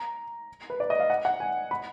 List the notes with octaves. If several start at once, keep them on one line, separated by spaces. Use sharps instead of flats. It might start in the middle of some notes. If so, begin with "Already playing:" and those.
Already playing: A#5
B4
D5
D#5
F5
F#5
F#5
G#5
B5